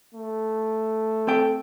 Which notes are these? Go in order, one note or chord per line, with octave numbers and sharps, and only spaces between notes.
A3
C4 A4 G5